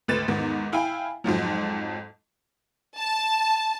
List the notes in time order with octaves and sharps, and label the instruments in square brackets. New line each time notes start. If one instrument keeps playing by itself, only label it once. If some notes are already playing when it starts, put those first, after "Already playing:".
[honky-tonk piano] G#1 D2 B4 A6 E7
E2 G#2 D#3 B3
E4 F5 G5 G#5 B5
F2 G#2 F3 F#3
[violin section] A5